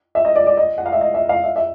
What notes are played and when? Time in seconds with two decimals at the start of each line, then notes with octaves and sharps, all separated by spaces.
0.15 E5
0.25 D#5
0.36 D5
0.47 D5
0.57 D#5
0.78 F#5
0.86 F5
0.92 E5
1.01 D#5
1.14 E5
1.29 F5
1.44 E5
1.56 E5